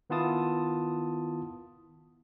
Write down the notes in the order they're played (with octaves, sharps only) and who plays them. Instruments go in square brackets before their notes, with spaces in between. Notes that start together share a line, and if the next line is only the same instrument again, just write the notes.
[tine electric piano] D#3 B3 E4 F4 A5 D#6